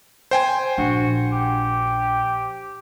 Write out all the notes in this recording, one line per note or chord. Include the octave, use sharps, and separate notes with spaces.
C5 G5 G#5
A#1 D4 F#4
G4